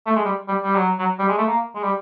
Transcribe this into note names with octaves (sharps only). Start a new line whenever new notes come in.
A3
G#3
G3
G3
G3
F#3
F#3
G3
G#3
A3
A#3
G#3
G3